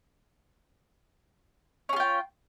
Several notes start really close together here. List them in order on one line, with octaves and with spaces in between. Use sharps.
C#4 G#4 F4 G5